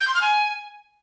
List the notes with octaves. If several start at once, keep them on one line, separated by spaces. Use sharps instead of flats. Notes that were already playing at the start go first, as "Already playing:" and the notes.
G6
C6
F6
G#5